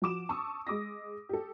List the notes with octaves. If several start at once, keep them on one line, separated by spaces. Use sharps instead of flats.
F3 F#4 D6 E7
A5 C#6 D#6 E6
G#3 D6 D#6 A#6
G4 A4